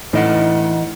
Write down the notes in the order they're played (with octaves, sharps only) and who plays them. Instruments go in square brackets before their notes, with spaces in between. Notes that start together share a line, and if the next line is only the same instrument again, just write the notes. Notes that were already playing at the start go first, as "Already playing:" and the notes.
[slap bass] A2 [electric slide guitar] E3 D#5 F#5 [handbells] D#4 E4